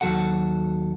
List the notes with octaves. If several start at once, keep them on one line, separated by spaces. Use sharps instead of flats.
D#2 C3 F#3 F#4 A4 F#5